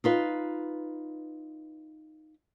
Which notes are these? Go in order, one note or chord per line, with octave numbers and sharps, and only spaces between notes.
D#4 F4 B4